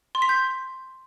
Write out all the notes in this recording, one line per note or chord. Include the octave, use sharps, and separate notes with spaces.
C6
B6
G6